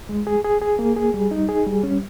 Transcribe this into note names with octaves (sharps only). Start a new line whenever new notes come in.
G#3
G#4
G#4
G#4
A#3
G#4
G3
D#4
G#4
G3
C#4